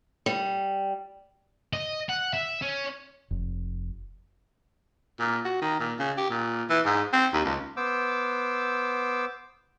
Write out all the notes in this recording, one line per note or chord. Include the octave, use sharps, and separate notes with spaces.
G3
D#5
F#5
E5
C#4
F1
A#2
F#4
D#3
A#2
C#3
G4
A#2
E3
G#2
C4
D#2
C#2
B3 C5 D6 E6